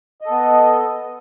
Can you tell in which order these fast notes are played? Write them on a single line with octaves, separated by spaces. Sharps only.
D#5 A4 B3